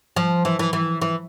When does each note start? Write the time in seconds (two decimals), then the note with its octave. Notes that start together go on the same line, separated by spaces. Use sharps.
0.16 F3
0.45 E3
0.59 E3
0.73 E3
1.01 E3